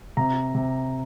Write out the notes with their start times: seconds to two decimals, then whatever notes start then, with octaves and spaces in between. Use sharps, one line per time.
0.17 C3 A#5
0.55 C3